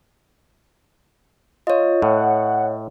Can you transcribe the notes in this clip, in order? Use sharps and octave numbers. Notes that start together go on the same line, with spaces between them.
F4 C#5 D#5
A2 F#5